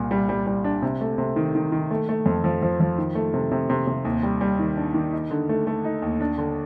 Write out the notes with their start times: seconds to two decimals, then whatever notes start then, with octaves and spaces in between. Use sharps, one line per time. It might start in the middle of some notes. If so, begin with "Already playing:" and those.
Already playing: C2 A#2
0.11 G3
0.29 G3
0.47 G3
0.64 D4
0.82 C3
1.01 A3
1.18 C3
1.36 D#3
1.55 D#3
1.72 D#3
1.91 A3
2.09 A3
2.26 F2
2.44 F3
2.62 F3
2.80 F3
2.98 D#3
3.15 A3
3.34 C3
3.52 C3
3.70 C3
3.87 C3
4.05 D#2
4.23 G3
4.41 G3
4.59 D#3
4.77 D4
4.94 D#3
5.13 D#4
5.31 D3
5.49 A3
5.67 A3
5.84 D#4
6.02 D#2
6.21 D4
6.38 D3